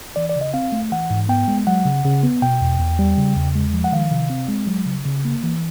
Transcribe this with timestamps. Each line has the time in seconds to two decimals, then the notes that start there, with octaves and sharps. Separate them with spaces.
0.16 E3 D5
0.30 D5
0.36 C#3
0.41 D#5
0.54 C4 F5
0.72 A3
0.92 E3 F#5
1.10 G#2
1.29 B3 G5
1.48 G#3
1.67 F#3 F#5
1.85 C#3
2.05 C#3
2.23 B3
2.42 B2 G5
2.61 E2
2.80 E2
2.99 G3
3.18 C#3
3.36 E2
3.55 G#3
3.73 F3
3.84 F#5
3.92 D#3 F5
4.11 C3
4.30 C4
4.49 G#3
4.67 F#3
4.86 C#3
5.05 C#3
5.25 A#3
5.43 E3